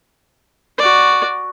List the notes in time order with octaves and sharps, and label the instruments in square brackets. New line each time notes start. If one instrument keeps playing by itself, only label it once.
[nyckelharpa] F#4 D5